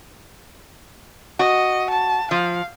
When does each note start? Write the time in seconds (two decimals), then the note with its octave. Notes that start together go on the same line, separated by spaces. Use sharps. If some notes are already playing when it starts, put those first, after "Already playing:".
1.39 F#4 D#5
1.90 A5
2.31 F3 F5